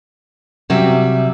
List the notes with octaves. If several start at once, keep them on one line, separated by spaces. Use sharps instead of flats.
C3 F#3 G3 E5